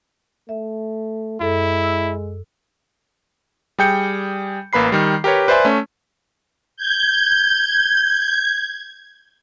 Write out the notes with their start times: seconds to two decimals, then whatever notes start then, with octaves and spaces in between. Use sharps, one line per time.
0.49 A3 E5
1.40 F#2 G#3 E4 A4
1.84 E6
3.79 G3 G#4 G5 G6 C#7
4.73 A1 A#3 B4 B5 C7
4.92 D#3 G3
5.24 G4 A#4 B4 C#5
5.48 B4 C5 D5 E5 G#5 C6
5.65 A3 C#4
6.77 G6 G#6